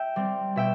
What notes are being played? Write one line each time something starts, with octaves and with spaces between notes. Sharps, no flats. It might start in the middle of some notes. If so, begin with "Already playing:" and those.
Already playing: E5 G5
G3 C4
B2 E5 G5